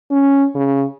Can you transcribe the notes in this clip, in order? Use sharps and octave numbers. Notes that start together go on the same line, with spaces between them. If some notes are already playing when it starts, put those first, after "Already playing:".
C#4
C#3